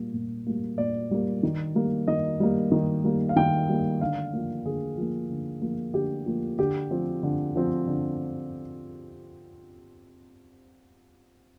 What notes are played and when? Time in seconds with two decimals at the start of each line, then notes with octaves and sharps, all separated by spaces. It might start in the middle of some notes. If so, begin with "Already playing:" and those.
Already playing: A#2 G3 A#3
0.14 A#2
0.47 G3 A#3
0.78 A#2 D5
1.11 G3 A#3
1.43 D#3
1.75 G3 A#3
2.08 D#3 D#5
2.40 G3 A#3
2.72 D#3
3.04 G3 A#3
3.29 F5
3.36 D#3 G5
3.69 G3 A#3
4.01 D3 F5
4.33 F3 A#3
4.65 D3 G#4
4.97 F3 A#3
5.30 D3
5.62 F3 A#3
5.94 D3 G4
6.26 F3 A#3
6.59 D3 G4
6.91 F3 C4
7.23 D3
7.56 F3 C4
7.88 D3